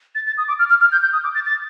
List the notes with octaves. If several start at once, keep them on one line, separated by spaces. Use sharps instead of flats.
A6
A6
D#6
D6
F6
F6
F6
G6
G6
D#6
D6
A6
A6